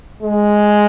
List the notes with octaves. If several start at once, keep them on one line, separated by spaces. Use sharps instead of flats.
G#3